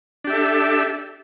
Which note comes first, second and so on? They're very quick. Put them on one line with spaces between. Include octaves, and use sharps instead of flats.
D4 G4 E5 A4